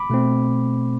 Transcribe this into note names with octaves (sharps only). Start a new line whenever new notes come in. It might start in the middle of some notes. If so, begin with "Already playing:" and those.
Already playing: B5 D6
B2 A3 C4